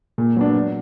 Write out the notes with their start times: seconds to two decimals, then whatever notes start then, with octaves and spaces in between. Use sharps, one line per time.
0.18 A#2
0.36 F#3 B3 D4
0.54 F#3